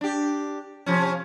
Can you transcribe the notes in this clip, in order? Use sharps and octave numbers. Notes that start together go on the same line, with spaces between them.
D4 G4
C3 F3 C#4